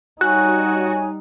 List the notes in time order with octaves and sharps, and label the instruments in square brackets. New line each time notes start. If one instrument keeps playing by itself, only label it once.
[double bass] G3 D#4 [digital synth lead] F#4 [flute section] C#5 G#5 [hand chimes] F#6